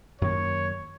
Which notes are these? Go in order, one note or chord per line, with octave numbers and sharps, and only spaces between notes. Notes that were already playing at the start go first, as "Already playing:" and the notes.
F#2 D#3 A#3 C#5